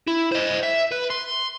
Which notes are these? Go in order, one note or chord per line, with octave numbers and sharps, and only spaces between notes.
E4
C5 D#5
E5
B4
C6